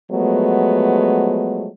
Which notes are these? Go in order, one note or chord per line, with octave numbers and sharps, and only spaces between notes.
F3 F#3 G#3 A3 B3